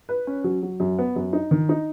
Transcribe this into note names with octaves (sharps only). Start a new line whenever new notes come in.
B4
C#4
F#3
F#3
F#2
B3
F#2
D#4
D#3
D#4